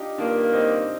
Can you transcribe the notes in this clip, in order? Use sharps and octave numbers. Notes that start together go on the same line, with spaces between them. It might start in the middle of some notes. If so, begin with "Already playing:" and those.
Already playing: D4 D#4 F4 G4
G2 D#3 A#3 D4 F4
C4 D#4